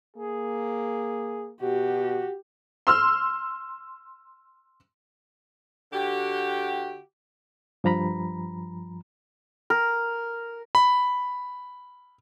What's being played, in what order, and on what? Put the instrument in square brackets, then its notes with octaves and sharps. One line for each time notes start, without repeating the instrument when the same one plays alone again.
[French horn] A#3 [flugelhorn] G#4
[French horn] B2 [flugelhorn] F#4 [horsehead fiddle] G4
[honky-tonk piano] C6 E6 F6
[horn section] D3 F#4 G4
[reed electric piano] G2 F3 A#5 B5
[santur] A#4
[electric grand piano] B5